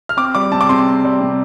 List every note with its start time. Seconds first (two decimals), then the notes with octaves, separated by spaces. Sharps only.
0.09 F6
0.17 C4 D6
0.35 G3 D6
0.52 C3 A5
0.61 D6
0.69 C3 C6
0.87 C4
1.04 G3
1.21 C3